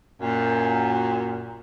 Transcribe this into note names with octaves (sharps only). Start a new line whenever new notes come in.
F#2 A#2